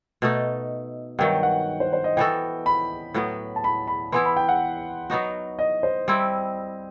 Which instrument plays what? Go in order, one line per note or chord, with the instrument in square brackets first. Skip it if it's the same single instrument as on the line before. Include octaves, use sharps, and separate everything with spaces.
[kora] B2 A3 D#4
[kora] G2 D#3 F#3 [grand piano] G5
[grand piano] F#5
C5
C5
D#5
[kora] E3 B3 F#4 A4 [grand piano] G5
[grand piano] B5
[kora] A2 F#3 B3
[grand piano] A5
B5
B5
[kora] E3 B3 E4 [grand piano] C6
[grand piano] B5
G5
F#5
[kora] F#3 B3 D#4 F#4
[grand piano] D#5
C5
[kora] G3 C4 E4